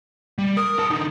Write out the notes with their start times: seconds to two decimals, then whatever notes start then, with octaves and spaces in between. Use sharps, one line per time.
0.38 G3
0.57 A#4 D#6
0.79 A#4 A5
0.90 D3 D#4